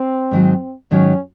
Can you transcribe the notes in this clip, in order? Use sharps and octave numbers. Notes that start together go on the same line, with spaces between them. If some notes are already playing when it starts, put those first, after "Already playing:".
Already playing: C4
G#2 D#3 F#3
G#2 D#3 F#3 C#4